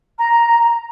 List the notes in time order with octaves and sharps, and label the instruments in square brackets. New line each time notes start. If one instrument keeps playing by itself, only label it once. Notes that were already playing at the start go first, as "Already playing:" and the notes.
[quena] A#5